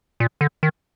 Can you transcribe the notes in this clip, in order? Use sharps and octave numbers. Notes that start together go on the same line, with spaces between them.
A#2
D3
D#3